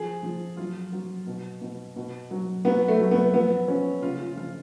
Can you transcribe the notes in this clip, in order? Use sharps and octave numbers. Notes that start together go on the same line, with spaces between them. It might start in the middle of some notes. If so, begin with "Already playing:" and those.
Already playing: F3 G#4
F3
F#3 F4
F#3
B2
B2
B2
F#3
F#3 B3
A3
F#3
B3
F3 B3
F3 C#4
C#3 F4
F4
F3 F4